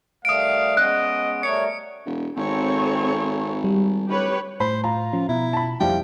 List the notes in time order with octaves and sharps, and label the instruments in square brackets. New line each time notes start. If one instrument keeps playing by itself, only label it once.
[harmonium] D#3 G3 A3 [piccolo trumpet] F5 [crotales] D#6 D7
[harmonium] G#3 B3 C#4 [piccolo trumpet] D#5 [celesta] F#6
[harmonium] G3 A3 A#4 [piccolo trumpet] C#5 [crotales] C#7
[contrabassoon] E1
[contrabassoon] G#1 [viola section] C4 A4 C#5
[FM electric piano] G3
[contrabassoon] D1 [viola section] G4 B4 C#5
[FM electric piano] A2 [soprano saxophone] C5 [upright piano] B5
[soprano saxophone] F4 [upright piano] A#5
[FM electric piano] F3 C#4
[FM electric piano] B2 [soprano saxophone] E4
[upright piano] A5 B5
[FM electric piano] F2 E4 [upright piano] F3 G3 [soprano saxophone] G5